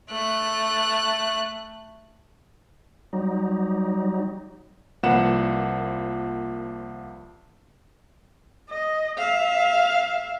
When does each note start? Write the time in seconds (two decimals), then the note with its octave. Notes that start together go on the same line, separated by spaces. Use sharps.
0.10 A3 F#6
3.13 F#3 G3 D#4
5.03 C2 F3 A#3 B4 F#5 E7
8.70 D#5
9.18 E5 F5